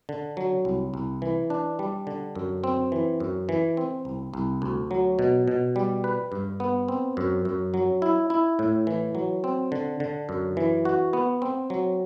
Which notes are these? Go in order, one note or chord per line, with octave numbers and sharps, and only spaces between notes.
D3
F#3
C2
C2
E3
D4
G3
D3
F#2
C4
E3
F#2
E3
C4
C2
C2
D2
F#3
B2
B2
G3
B4
G2
B3
C4
F#2
F#2
F#3
E4
E4
A2
E3
F#3
C4
D3
D3
F#2
E3
F#4
B3
C4
F#3